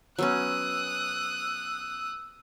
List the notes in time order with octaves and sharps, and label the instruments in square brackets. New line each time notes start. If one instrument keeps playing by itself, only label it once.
[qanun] F#3 B3 C#4 [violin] D#6 F#6 [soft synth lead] E6